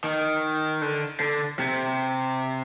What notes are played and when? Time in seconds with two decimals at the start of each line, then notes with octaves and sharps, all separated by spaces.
0.04 D#3
0.82 D3
1.20 D3
1.59 C3